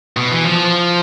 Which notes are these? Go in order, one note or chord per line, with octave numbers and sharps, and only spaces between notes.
B2
E3
F3